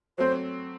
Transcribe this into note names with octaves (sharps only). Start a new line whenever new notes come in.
F#3 A3 C4 C5